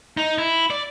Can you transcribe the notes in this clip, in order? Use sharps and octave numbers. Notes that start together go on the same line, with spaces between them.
D#4
E4
D5